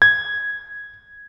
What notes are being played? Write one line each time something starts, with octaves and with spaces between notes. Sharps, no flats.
G#6